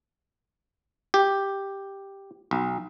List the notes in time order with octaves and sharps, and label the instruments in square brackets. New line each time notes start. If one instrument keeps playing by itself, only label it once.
[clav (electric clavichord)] G4
B1